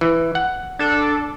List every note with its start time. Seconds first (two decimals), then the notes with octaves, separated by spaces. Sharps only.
0.01 E3
0.35 F#5
0.79 D4 A4